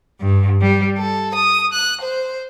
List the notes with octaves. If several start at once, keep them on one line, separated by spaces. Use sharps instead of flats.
G2
G3
A4
D#6
F#6
C5